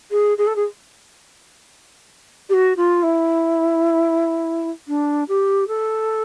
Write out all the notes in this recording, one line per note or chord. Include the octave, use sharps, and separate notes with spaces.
G#4
G#4
A4
G#4
G4
F#4
F4
E4
D4
G4
A4